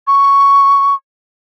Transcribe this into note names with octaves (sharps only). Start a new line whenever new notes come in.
C#6